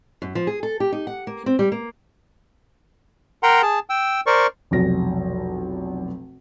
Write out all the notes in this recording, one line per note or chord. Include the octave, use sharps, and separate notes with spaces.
F#2
F3
G#4
A4
G4
D#4
F#5
A#3
C4
G3
A#3
A#4 F#5 G5 A#5 C6
G#4 A5
G5 E6
A#4 C5 D5 C#6
F1 B1 A#6